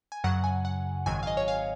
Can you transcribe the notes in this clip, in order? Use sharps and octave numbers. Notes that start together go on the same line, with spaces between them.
G#5
F#2 C#3 F#3 F#5
G#5
F#5
G#1 G#2 D#3 F#3 G#5
F5
D#5
C#5
F5